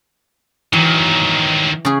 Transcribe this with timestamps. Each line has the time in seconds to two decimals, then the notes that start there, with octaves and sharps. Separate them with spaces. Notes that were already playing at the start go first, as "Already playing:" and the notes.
0.73 D#3 E3 F#3
1.85 C#3 G#4